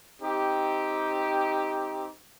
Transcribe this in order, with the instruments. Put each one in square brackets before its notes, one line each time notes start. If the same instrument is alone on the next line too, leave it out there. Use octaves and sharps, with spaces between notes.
[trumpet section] C4 D#4 G4